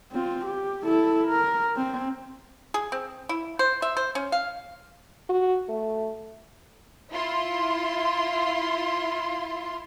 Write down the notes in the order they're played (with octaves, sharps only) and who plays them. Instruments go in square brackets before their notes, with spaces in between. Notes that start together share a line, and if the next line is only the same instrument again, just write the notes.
[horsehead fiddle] C4 F4
G4
E4 A4
A#4
C4
[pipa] G#4
C4
E4
C5
E5
C5
C#4
F5
[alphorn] F#4
A3
[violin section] E4 F4 C6